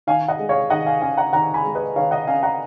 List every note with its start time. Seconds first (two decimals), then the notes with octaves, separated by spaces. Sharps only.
0.07 D#3 F5 G#5
0.28 D#5 F#5
0.39 G#3
0.49 C#5 F5
0.70 D#3 D#5 F#5
0.86 F5 G#5
1.01 C#4 F5 G#5
1.17 F#5 A#5
1.33 D#3 F#5 A#5
1.54 G#5 B5
1.64 G#3
1.75 B4 D#5
1.96 D#3 C#5 F5
2.11 D#5 F#5
2.27 C#4 F5 G#5
2.43 F#5 A#5